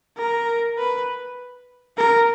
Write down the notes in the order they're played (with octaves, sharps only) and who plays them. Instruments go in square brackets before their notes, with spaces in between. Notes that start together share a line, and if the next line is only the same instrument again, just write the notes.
[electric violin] A#4
B4
A#4